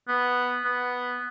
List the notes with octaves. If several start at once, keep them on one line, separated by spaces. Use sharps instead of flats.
B3
B3